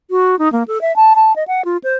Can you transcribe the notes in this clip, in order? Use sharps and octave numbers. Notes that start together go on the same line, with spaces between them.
F#4
D#4
A#3
A4
E5
A5
A5
D#5
F#5
F4
C5